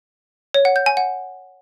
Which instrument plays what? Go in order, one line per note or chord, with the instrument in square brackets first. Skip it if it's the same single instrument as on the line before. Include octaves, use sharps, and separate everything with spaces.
[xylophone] C#5
F#5
G6
G#5
F#5